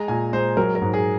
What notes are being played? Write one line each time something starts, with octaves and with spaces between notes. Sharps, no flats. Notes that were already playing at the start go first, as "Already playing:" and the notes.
Already playing: G#3 A#5
A#2 G#5
G#3 C5
F#3 A#4
A#4
G#2
G#4